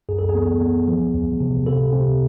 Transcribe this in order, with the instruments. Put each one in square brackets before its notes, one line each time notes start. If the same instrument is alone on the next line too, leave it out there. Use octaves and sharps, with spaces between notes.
[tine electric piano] F#2 G#4
A4
G#4
B3
B3
F3
E2
C3
C3 A4
C3